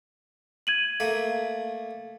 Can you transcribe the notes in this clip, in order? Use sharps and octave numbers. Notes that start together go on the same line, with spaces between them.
G#6 D#7 F#7
A3 A#3